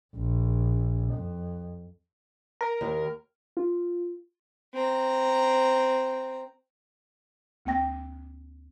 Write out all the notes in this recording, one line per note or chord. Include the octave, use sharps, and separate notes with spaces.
A#1
F2
A#4 A#5
D#2
F4
C4 A#5
D2 A#3 C4 G5 A#6